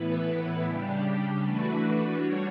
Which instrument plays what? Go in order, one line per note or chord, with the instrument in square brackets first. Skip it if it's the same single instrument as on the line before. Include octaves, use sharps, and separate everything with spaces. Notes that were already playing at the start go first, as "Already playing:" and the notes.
Already playing: [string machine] A2 E3 B3 E4 B4
C#3 G3 D4 G4
E3 A3 D4 F#4 B4
G3 D4 F#4 C#5